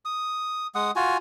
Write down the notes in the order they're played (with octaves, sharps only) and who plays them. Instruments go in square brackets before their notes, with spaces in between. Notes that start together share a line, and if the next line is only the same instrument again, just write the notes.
[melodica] D#6
G#3 F#5 D#6
F4 F#4 G#5